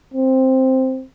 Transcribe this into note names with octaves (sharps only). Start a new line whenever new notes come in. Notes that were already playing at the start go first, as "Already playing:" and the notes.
C4